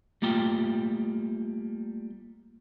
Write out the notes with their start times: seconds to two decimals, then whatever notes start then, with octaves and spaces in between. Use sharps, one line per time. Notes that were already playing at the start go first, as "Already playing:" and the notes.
0.22 G3 A3 A#3 F4 G5